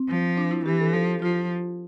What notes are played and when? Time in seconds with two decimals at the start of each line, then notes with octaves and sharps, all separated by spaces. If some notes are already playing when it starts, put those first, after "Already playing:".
Already playing: C4
0.09 F3
0.37 D4
0.51 E4
0.65 E3 G4
0.80 A4
0.93 F3 A4
1.22 F3 F4